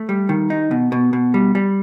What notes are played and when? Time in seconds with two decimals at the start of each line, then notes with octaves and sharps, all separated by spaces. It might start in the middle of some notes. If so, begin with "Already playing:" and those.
Already playing: A3
0.09 G3
0.29 D#3
0.50 D#4
0.71 B2
0.92 B2
1.13 B2
1.34 G3
1.55 G3